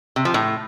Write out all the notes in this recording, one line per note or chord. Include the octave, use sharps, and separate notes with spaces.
C3
F3
A2